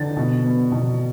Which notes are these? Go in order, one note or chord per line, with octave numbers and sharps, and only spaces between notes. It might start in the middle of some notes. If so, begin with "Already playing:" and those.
Already playing: D3 A6
B2
B3
B2